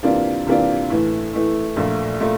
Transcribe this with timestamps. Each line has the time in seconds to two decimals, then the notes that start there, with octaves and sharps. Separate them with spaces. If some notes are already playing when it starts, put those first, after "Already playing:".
0.03 C3 E3 A#3 D4 F4
0.47 C3 E3 A#3 D4 F4
0.90 A2 E3 A3
1.33 A2 E3 A3
1.76 A#1 A#2 A3
2.20 A#2 A3